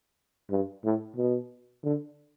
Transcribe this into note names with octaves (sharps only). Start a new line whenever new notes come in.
G2
A2
B2
D3